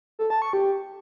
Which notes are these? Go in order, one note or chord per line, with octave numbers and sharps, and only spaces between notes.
A4
A5
C#6
G4